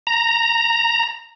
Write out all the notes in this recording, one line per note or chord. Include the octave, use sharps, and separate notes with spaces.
A#5